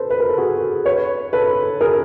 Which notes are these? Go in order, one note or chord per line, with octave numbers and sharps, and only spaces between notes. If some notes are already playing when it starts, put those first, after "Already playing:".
Already playing: A4 B4 C5
B4
A#4
A4
F#4 G#4
B4 C#5
A4 B4
G#4 A#4